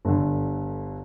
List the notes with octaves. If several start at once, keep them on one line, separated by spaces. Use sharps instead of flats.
G1 D3